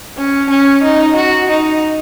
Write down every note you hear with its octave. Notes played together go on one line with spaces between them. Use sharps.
C#4
C#4
D#4
F#4
D#4